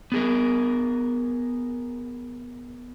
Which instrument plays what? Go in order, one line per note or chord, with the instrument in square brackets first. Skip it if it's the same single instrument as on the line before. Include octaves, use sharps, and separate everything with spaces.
[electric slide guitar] B3 G#4 A#4